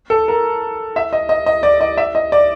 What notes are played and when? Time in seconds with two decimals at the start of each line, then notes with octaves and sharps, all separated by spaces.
0.10 A4
0.28 A#4
0.96 E5
1.13 D#5
1.29 D#5
1.46 D#5
1.63 D5
1.81 D#5
1.97 E5
2.15 D#5
2.32 D5